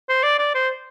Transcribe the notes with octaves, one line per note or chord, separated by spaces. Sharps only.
C5
D5
D5
C5